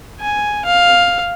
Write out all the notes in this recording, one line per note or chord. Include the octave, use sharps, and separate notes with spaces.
G#5
F5